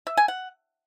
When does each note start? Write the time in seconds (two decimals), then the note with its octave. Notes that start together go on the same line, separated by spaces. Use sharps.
0.07 E5
0.17 G#5
0.28 F#5